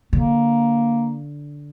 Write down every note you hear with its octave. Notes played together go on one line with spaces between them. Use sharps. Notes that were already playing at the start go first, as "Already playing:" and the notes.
D3 A#3